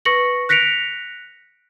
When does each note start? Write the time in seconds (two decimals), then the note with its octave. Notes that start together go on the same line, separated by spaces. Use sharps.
0.05 B4 C#6 A#6 C#7 F#7
0.49 F#6 A#6 B6 C#7 D7 F7